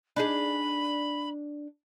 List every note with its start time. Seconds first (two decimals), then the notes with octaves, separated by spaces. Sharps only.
0.16 D4 D#4 G#4 B5